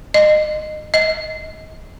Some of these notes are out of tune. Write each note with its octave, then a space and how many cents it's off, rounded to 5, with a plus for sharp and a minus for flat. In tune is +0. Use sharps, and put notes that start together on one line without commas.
D#5 -25
D#5 +30